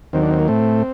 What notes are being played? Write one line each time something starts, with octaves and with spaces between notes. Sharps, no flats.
D#2 D#3 F#3 C4
D4
C4
A#3
A2 A3 C4